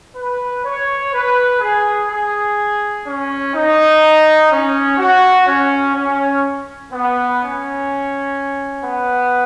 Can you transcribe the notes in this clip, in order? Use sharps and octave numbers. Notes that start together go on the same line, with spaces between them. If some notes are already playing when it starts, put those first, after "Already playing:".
B4
C#5
B4
G#4
G#4
C#4
D#4
C#4
F#4
C#4
C#4
B3
C#4
B3